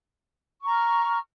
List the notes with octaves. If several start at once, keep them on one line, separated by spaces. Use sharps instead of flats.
A#5 C#6 F6